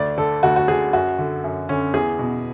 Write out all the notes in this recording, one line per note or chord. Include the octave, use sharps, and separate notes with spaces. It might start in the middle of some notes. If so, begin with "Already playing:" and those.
Already playing: D2 D5
D3 A4
D2 F#4
F#4
D3 G#4
F#2 F#4
D3
F#2
D3 C#4
E2 G#4
B2